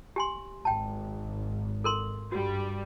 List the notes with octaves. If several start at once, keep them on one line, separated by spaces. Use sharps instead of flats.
G4 G#5 C6
G#1 G5 A5
A4 A#4 C6
G2 G3 F#4